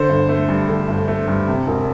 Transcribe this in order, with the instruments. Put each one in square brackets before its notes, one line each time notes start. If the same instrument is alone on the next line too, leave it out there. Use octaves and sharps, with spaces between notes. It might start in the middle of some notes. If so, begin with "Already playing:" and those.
Already playing: [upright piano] D3 C5
G1
A3
G2
D3
G1
A3
G2
C3
E1